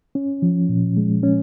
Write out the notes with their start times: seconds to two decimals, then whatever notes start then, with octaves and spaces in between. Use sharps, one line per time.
0.15 C#4
0.42 F3
0.69 A#2
0.97 G#3
1.23 C#4